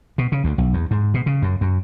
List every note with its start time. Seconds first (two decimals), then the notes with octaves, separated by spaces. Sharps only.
0.18 B2
0.32 C#3
0.44 D2
0.58 B1
0.73 E2
0.91 G#2
1.14 B2
1.26 C#3
1.42 F#2
1.61 F#2